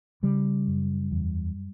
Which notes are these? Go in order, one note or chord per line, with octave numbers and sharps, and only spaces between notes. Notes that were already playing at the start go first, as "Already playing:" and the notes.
C#3 G3
F#2
E2